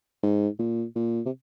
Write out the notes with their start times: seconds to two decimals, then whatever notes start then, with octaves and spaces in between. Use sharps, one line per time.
0.23 G#2
0.59 A#2
0.96 A#2
1.26 C3